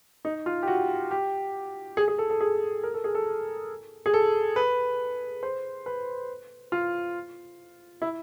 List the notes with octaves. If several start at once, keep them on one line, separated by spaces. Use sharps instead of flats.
D#4
F4
G4
F#4
G4
G#4
G#4
A4
A4
G#4
A#4
A4
G#4
A4
G#4
A4
B4
C5
B4
F4
E4